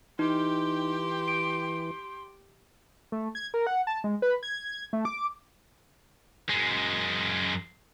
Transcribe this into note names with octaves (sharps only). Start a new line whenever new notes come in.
E3 D#4 G4 G5 C6
D7
A3
G#6
A#4
F#5
A5
G#3
B4
G#6
A3
D6
F#2 G#3